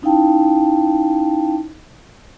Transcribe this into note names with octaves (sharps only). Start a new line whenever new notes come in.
C#4 D#4 E4 F5 G5 A5